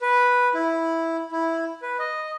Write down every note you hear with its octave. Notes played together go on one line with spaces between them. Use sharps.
B4
E4
E4
B4
D#5